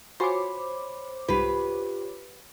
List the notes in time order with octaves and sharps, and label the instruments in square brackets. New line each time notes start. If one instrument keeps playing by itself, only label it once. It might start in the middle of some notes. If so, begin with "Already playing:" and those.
[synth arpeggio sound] F4 F#4 G#5 [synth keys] C5 C#5 D6 [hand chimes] B5
[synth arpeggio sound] C2 G#2 [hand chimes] F4 G4 [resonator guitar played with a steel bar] B4